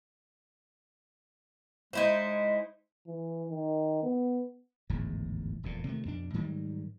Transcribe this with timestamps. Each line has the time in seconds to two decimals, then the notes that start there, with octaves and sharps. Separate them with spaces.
1.93 G#3 D#4 E4 C5
3.07 E3
3.50 D#3
4.03 B3
4.90 D1 G#1 E2 G#2
5.63 E1 F2 A#2
5.84 C3 D#3 A3
6.05 F2 B2 D4
6.34 G#2 D#3 F#3 G3